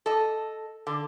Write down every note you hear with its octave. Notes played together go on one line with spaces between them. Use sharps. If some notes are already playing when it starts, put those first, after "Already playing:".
A4 D#5
D3